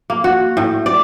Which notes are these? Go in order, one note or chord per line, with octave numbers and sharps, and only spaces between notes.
A#3
F#4
A2
D5